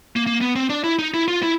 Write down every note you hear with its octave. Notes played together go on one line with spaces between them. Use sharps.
A#3
A#3
B3
C4
D4
E4
D#4
E4
F4
E4